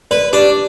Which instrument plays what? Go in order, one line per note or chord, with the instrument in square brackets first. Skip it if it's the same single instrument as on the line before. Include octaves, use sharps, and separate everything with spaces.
[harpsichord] B4 [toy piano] D5
[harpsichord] D4 [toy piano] G4